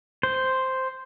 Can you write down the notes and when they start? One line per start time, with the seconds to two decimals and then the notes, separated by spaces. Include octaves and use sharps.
0.23 C5